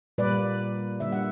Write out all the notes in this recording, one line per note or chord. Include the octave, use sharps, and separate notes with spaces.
A#2 G3 A#3 B4 D5
D3 G3 A#3 E5
F#5